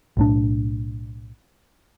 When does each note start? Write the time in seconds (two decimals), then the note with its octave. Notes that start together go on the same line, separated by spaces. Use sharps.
0.17 B1 A2 D4